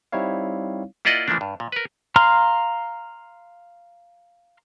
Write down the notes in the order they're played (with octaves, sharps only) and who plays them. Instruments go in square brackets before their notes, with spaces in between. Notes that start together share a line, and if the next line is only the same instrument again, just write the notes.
[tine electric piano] G3 C4 D#4 E4 C#5 F5
[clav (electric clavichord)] A#3 E4 F4 D5 D#5 F#5
E3 F3 A3 A#3 D4
G2
A#2
A#4 B4
[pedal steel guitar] F5 A#5 C6 F6